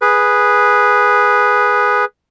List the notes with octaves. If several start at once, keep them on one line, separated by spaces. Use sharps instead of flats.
G#4 B4